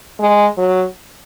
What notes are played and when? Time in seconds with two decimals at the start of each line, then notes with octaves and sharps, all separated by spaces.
0.20 G#3
0.58 F#3